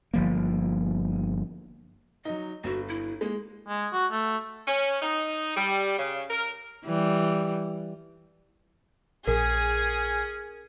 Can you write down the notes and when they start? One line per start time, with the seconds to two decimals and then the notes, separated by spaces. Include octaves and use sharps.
0.14 G1 F3 A#3
2.25 F#3 D#4 D#5
2.64 G1 F#4
2.89 E4
3.21 G#3 A#3
3.68 G#3
3.92 F#4
4.12 A3
4.67 C#4
5.01 D#4
5.55 G3
5.98 C#3
6.30 A#4
6.85 E3 G3
9.28 A#1 C#4 G#4 A#4